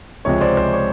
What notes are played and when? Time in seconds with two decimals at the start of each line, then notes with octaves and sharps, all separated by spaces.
0.25 C#2 C3 F3 G#3 C#5
0.41 C5 D5
0.57 C5
0.73 C#5